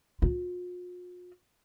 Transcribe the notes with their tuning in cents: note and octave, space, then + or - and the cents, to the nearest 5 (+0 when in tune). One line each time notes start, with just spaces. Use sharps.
F4 +45